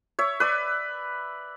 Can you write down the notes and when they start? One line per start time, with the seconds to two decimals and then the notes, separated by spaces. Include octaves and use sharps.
0.19 C#5 E5
0.40 B4 D5